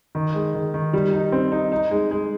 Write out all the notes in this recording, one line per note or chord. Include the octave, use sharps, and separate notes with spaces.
D#3
G#3
D#3
D#3
G3
D#4
C4
D#4
D#4
G#3
G#3